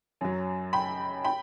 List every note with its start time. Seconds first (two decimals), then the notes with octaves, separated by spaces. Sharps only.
0.21 F#2 F#3
0.73 G5 B5
1.25 G5 B5